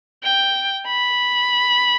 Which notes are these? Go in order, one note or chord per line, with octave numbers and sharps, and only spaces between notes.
G5
B5